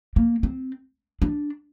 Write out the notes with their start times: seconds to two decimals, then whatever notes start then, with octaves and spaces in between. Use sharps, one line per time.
0.16 A#3
0.43 C4
1.22 D4